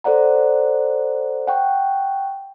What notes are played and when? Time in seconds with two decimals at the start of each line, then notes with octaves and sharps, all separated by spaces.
0.04 A4 C5 D5 F#5 A#5
1.47 F#5 G5 C#6